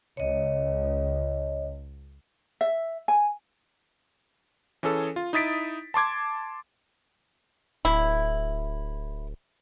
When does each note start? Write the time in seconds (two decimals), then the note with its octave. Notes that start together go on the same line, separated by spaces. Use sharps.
0.17 C#2 C#5 D#5
2.61 E5
3.08 G#5
4.83 E3 C#4 G#4 A4
5.16 F4
5.33 D#4 E4 D#6 A6 B6 D7
5.94 A5 C6 D6 G#6
7.85 D1 E4